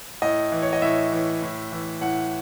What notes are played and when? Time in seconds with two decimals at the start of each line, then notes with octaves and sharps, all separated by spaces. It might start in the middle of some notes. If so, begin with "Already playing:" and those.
0.22 A2 D#5
0.52 E3
0.62 C#5
0.73 D#5
0.82 A2 E5
1.12 E3
1.43 A2
1.72 E3
2.01 A2 F#5